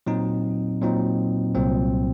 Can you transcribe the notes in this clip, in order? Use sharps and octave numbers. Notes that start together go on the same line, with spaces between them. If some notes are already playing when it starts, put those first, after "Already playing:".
A#2 F#3 C4 D#4
A#2 F#3 C4 D#4
C2 A#2 F#3 C4